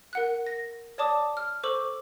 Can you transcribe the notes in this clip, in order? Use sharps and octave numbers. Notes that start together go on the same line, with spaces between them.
A#4 F#5 F#6
A#6
C#5 D5 A5 D6 D#6
F6
A4 C5 C#6 D6 E6 F#7